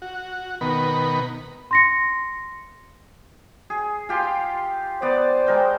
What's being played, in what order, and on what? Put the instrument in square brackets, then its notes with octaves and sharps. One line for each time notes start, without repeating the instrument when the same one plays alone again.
[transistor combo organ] F#4
B2 D#3 B3 A#4 B5
[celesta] C6 A#6 C#7
[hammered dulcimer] G#4
F4 G4 C6
[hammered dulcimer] B3 D5 [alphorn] C5
[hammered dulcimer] G#3 A#4 G5